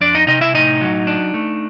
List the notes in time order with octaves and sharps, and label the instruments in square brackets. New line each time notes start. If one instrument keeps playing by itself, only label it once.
[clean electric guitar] F2 D4 D5
D#4 D#5
C3 D#4 D#5
E4 E5
A2 D#4 D#5
F#3
D4
A3